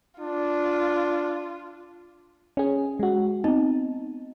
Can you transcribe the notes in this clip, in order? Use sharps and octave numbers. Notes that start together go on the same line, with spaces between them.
D4 F4
C#4 G#4
G#3 F#4
B3 C4 D#4